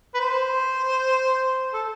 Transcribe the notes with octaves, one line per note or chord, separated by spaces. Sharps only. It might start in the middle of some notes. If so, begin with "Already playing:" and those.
B4
C5
A4